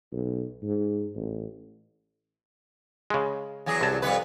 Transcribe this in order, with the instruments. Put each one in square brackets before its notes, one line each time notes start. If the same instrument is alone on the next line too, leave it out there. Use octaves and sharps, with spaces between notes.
[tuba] B1
G#2
A1
[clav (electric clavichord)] C#3 G#3
[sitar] E2 F#3 G#4
[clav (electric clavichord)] C2 A5
[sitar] F2 G3 B4